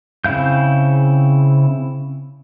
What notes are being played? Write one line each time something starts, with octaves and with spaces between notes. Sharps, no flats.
C#3 C4 E4 F5 G6